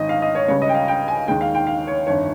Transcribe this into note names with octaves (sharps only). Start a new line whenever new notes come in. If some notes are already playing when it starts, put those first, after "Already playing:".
Already playing: G#1 D#3 D#5
F5
D#5
C#5
C#2 C#3 G3 C#5
D#5
G5
F5
G5
G#5
D#2 D#3 G#3 G5
F5
G5
F5
C#5
G1 F2 D#3 C#5